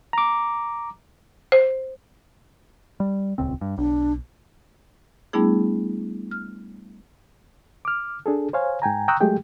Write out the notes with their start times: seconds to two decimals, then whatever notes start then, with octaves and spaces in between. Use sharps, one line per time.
0.13 A#5 D6
1.52 C5
3.00 G3
3.38 D#1 C#2 C4
3.61 G2
3.78 B1 D4
5.33 G3 A3 B3 D4 E4 G#4
6.31 F6
7.85 D6 F6
8.26 D4 G#4 A4
8.53 C5 C#5 F5 G#5
8.82 G#2 G5 G#5 A#5
9.08 G5 A#5 C#6 D#6 E6 F#6
9.20 F#3 G#3 A3 G4 G#4 G5